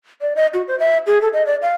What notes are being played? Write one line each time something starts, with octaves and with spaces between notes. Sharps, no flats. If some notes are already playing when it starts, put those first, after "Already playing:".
D5
D#5
F#4
C5
E5
G#4
A4
D#5
D5
F5